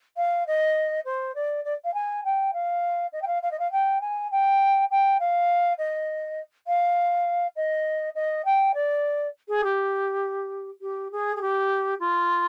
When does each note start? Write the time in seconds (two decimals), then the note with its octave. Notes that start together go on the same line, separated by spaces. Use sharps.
0.17 F5
0.47 D#5
1.05 C5
1.35 D5
1.64 D5
1.84 F5
1.94 G#5
2.24 G5
2.53 F5
3.13 D#5
3.22 G5
3.27 F5
3.42 F5
3.51 D#5
3.59 F5
3.72 G5
4.01 G#5
4.31 G5
4.91 G5
5.20 F5
5.78 D#5
6.67 F5
7.56 D#5
8.15 D#5
8.45 G5
8.74 D5
9.48 G#4
9.63 G4
10.81 G4
11.11 G#4
11.36 G#4
11.41 G4
11.99 F4